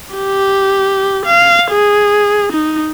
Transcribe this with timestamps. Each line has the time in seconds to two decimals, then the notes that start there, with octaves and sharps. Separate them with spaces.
0.15 G4
1.26 F5
1.71 G#4
2.52 D#4